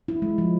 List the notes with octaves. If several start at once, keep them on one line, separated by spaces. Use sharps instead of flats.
E4
G#3
F3